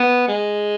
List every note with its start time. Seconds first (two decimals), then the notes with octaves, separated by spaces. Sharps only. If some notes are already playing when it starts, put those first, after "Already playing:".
Already playing: B3
0.28 G#3